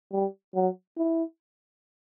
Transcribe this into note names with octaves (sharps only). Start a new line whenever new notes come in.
G3
F#3
E4